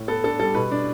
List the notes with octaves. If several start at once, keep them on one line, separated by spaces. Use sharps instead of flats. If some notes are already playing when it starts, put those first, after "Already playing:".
Already playing: A2
B3 A4
D4 A4
G3 A4
B2 B4
D4